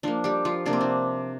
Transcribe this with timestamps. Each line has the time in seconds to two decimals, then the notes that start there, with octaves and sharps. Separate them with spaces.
0.03 F3 A#3 D4
0.24 G3 G4
0.45 F3 F4
0.66 C3 A#3 D4
0.73 C4
0.81 D4